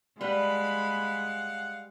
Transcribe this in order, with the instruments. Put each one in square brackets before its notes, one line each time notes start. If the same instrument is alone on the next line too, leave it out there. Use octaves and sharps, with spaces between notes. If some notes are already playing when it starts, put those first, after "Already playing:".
[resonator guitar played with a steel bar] G3 B4 [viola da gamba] G#3 [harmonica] F5 F#5 [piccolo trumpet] B5